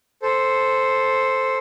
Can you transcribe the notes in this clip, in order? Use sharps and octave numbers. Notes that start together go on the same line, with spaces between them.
A4 C5